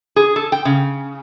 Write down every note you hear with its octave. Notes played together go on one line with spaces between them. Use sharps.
G#4
A4
G5
C#3